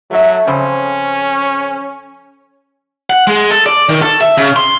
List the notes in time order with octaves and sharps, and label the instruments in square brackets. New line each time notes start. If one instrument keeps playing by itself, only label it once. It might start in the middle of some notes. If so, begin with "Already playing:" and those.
[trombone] F#3 [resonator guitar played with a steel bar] A3 A4 E5
[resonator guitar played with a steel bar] F2 C#3 C5 [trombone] C#4
[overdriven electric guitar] F#5
G#3
A4
D5
D#3
A4
E5
C#3
C6